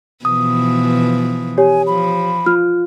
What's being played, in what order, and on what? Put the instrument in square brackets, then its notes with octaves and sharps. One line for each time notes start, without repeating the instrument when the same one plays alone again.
[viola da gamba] B2 E3 F3 [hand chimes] D#6
[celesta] G4 C#5 [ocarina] G#5
[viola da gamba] F3 [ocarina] B5
[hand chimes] F4 [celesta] F6